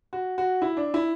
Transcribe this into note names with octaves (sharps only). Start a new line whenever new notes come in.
F#4
F#4
E4
D4
E4